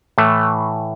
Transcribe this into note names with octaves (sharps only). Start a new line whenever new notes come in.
A2 E3 A3